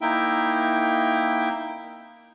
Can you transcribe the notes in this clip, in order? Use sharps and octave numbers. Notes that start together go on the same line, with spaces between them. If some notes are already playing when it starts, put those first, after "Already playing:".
A#3 D#4 E4 E5 G5